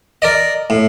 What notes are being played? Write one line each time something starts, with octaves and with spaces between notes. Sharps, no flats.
A#4 D5 D#5
A2